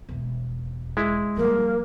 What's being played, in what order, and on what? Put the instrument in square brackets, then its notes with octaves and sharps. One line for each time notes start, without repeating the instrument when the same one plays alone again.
[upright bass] E1 E2
[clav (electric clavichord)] G#3 E4
[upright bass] F3 G3 [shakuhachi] A#3